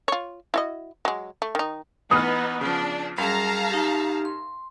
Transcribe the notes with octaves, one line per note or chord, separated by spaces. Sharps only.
F4 C#5
E4 F#4 D#5
F#3 G#3
A3
D#3 D#4
E3 B3 D#4 D#6 F6
C#3 F3 D4
F#2 G3 G#4 F5 A5 A#5
D#4 G4
C6